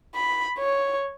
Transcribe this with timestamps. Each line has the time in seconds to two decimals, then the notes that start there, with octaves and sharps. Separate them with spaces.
0.15 B5
0.59 C#5